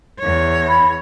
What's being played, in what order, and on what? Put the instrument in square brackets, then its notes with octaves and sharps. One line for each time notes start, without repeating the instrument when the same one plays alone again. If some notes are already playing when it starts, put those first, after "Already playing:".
[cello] E2 C#5
[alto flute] B5